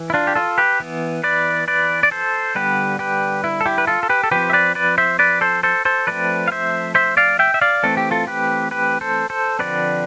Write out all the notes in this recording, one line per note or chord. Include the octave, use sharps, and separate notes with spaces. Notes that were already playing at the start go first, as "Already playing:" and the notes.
Already playing: E3
E4
D4 F4
G4
F4 A4
G4 B4
E3 B3
B4 D5
B4 D5
D5
A4 C5
D3 G3 B3 G4 B4
G4 B4
E4
A4
E4 G4
B4
F4 A4
A4
G4 B4
A4
F3 C4 G4 B4
E5
B4 D5
B4 D5
C5 E5
B4 D5
A4 C5
A4 C5
A4 C5
F3 A3 C4 B4 D5
F5
C5 E5
C5 E5
D5 F5
E5 G5
E5
D5 F5
E3 A3 C4 A4
G4
F4 A4
G4 B4
G4 B4
A4 C5
A4 C5
D3 F3 C4 B4 D5